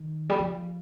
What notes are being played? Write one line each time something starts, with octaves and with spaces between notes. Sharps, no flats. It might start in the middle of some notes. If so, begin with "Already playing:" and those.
Already playing: D#3
G3
F3